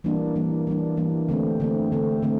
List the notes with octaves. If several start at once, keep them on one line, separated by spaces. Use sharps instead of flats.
E3 G3 A#3 D4
E3 G3 A#3 D4
E3 G3 A#3 D4
E3 G3 A#3 D4
D3 A3 C4
D3 A3 C4
D3 A3 C4
D3 A3 C4